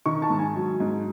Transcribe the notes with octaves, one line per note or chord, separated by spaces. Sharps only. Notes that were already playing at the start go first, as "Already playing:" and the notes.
D#3 C#6
A5
G#2
G#5
F#3
G#2